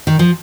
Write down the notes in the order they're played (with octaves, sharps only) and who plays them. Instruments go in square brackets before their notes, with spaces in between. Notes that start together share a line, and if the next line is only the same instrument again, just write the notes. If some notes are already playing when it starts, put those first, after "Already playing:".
[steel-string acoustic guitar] D#3
F3